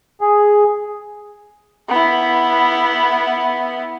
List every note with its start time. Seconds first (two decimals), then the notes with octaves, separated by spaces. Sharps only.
0.21 G#4
1.89 B3 E4